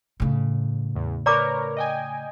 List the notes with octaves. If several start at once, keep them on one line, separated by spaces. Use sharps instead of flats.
A2 C#3
E2
A#4 B4 C#5 D5 A#5 D6
D#5 G5 G#5